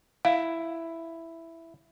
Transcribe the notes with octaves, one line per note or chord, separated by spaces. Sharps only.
E4 F5